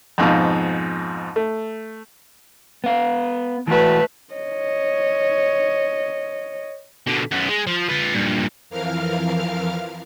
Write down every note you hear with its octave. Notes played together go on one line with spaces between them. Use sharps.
F2 G#2 B2 F3
A3
B3 F5
E3 A3 F#4 B4
C#5 D#5
B2 D3
F#2 B3
G#3
F3
F4 B4
G2 A#2
F2 E3 F3 A#4 F5 F6